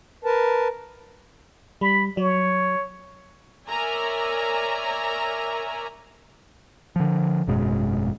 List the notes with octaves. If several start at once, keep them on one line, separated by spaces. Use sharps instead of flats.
A#4 B4 A5
G3 B5
F#3 C#5
A#4 C#5 D5 E5 G#5 A#5
D3 F3
G#1 F#2 B2 G#3